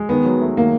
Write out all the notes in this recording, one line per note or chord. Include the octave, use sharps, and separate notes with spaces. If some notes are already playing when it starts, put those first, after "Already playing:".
Already playing: G#3
D#3 B3
F#3
A3
D#3 A#3